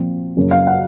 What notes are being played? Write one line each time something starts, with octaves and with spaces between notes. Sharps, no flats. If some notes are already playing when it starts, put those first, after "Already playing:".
Already playing: A#2 F3 C4
F#2 C#3 F#3 A#3 C#4
F5
F#5